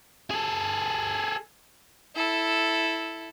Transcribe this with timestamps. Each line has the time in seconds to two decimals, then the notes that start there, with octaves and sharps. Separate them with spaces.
0.31 G#4 A4
2.16 E4 A4